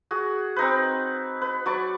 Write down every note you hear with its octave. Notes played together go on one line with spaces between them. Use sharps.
F#4 G#4
C4 D#4 B4
B4
F#3 B4 D5 C#6